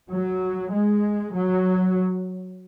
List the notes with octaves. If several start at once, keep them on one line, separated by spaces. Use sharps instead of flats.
F#3
G#3
F#3